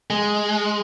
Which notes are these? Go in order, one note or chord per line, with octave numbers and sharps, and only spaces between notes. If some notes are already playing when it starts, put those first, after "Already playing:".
G#3